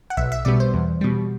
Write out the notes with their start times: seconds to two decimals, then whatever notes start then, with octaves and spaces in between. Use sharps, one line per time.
0.10 F#5
0.17 B1 E5
0.32 E5
0.45 B2 G3 B3 D5
0.60 C5
0.74 E2
1.01 B2 G3